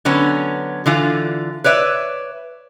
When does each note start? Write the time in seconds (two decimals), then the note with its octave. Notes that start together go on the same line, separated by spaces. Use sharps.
0.05 D3 F#3 B3 C#4
0.86 D3 E3 F4
1.64 B4 C#5 D5 E5